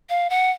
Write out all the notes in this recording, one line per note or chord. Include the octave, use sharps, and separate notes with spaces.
F5
F#5